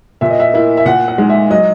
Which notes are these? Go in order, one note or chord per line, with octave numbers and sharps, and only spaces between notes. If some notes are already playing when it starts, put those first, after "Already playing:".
A#2 E5
D#5
E5
A#3 E4
E5
A#2 F#5
F#5
G#3 D#4
E5
F#3 D#5